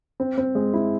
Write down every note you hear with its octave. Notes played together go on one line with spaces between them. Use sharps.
C4
C4
G#3
E4